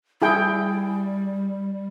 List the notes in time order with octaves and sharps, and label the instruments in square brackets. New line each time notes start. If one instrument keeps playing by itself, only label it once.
[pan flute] G3 [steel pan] E4 G#4 G5